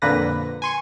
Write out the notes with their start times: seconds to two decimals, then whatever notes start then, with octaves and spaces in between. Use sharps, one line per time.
0.02 F2 A#2 D3 A#3 B4 A#6
0.62 G#5 C6 C#6